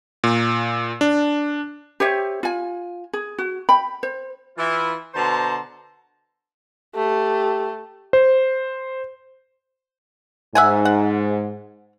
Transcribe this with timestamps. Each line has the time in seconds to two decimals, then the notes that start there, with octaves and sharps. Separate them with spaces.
0.24 A#2
1.01 D4
2.00 G4 C5 C#5 E5
2.43 F4 G#5
3.13 G#4
3.38 F#4
3.69 G5 B5
4.03 C5
4.57 E3 E4 F4
5.14 B2 D3 C5 A5 A#5 C6
6.96 A3 G4
8.13 C5
10.55 G#2 E5 F#5 G#5
10.85 F#5